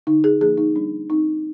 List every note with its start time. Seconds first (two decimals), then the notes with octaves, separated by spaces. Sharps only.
0.07 D3 D#4
0.24 G#4
0.40 F3 A#3 G#4
0.58 D#4
0.76 G3 D4
1.10 C4 D#4